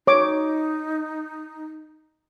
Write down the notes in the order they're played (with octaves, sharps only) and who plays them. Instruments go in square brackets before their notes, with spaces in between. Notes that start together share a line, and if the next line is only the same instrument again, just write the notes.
[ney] D#4 [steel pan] C#5 D6